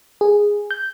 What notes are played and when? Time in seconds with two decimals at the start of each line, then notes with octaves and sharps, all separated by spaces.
0.21 G#4
0.71 G6